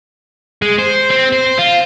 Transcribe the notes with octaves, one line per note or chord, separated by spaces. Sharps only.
G#3
C5
C4
C5
F4